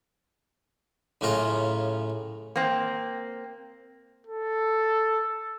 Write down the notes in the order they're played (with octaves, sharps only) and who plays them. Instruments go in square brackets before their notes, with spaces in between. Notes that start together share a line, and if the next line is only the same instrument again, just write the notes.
[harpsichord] F#2 A2 C#3 F4 A#5
[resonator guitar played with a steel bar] A#3 C4
[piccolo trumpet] A4